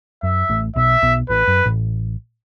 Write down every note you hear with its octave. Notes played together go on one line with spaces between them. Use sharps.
F#2 E5
A1 A2
B1 B2 E5
B1 B2
A1 A2 B4
F#2
A1 A2